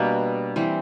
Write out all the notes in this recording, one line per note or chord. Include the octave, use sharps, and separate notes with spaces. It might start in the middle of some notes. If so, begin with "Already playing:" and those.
Already playing: B2 G3 A#3 D4
E3 G3 C4